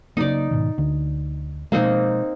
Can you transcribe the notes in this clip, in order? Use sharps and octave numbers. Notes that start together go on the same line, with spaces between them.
C#3 F#3 A#3 D#4 D5
G#2 B2 D#3
D2 D3
B2 F3 G#3 A#3 C4 D#4